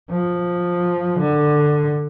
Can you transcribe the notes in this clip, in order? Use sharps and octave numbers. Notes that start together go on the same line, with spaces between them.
F3
D3